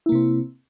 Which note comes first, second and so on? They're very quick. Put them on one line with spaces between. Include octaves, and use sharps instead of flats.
E4 A#3 C3 C4